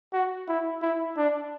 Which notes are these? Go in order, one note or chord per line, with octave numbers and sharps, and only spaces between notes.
F#4
E4
E4
D4